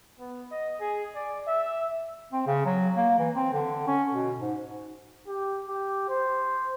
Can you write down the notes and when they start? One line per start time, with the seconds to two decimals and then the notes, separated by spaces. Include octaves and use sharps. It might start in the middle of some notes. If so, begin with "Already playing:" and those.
0.19 B3
0.51 D#5
0.80 G#4
1.15 D5
1.47 E5
2.33 C4
2.47 C#3
2.66 F#3
2.97 A#3
3.19 E3
3.36 C4
3.53 D3
3.87 C#4
4.12 B2
4.40 G#2
5.27 G4
5.68 G4
6.09 C5